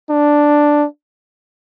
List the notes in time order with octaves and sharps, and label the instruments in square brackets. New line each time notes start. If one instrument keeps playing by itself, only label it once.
[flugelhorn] D4